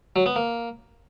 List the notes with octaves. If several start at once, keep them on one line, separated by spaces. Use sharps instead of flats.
F#3
B3
A#3